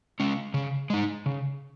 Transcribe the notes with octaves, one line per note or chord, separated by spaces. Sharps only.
G#3 C#4
C#3
G#3 D#4
C#3